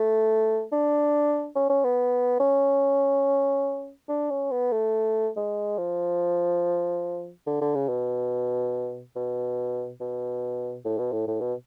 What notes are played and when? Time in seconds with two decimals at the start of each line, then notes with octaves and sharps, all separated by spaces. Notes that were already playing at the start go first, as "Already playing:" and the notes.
Already playing: A3
0.72 D4
1.55 C#4
1.69 C#4
1.84 B3
2.40 C#4
4.09 D4
4.30 C#4
4.51 B3
4.72 A3
5.36 G#3
5.78 F3
7.47 D3
7.61 D3
7.75 C#3
7.89 B2
9.16 B2
10.00 B2
10.85 A2
10.98 B2
11.12 A2
11.27 A2
11.41 B2